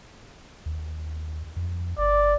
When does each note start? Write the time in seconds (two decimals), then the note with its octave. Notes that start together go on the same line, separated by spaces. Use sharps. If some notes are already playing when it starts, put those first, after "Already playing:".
0.66 D#2
1.56 F2
1.98 G1 D5